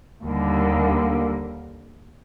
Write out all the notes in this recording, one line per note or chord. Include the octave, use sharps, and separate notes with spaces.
D#2 D3 G3 A#3